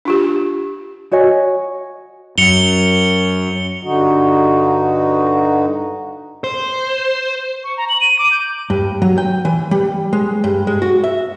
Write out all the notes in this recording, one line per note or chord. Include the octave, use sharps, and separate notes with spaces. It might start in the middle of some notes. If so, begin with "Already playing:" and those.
D4 F4 G4
F#4 C#5 D#5 G#5
F#2 C#7 F7 G7
G2 D3 D#4 F#4
C5
C#6
A#5
F#7
D#7
D6
G6
G2
F#3
G5
E3
G3
G#3
G2
G#3
F#4
E5